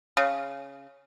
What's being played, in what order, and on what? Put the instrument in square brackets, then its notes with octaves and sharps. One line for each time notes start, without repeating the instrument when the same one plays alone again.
[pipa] C#3